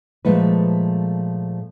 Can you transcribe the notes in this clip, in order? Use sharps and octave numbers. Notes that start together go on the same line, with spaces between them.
A#2 F3 G#3 A3 B4